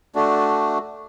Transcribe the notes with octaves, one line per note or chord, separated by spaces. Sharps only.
A3 D4 F#4